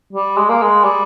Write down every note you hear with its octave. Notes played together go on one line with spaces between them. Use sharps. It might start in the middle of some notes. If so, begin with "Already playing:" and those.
G3
G#3
A#3
G#3
G3